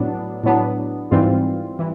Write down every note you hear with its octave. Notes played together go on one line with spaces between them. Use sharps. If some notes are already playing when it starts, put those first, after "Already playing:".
Already playing: A2 F#3 B3 D4
A2 F#3 B3 D4
G#2 E3 G3 C4 F4
E3